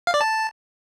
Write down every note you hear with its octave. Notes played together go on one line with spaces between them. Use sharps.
F5
D5
A5